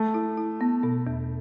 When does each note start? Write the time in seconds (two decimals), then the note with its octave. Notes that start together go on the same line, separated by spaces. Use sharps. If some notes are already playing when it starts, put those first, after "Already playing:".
Already playing: A3
0.14 E4
0.37 E4
0.61 B3
0.83 B2
1.07 E2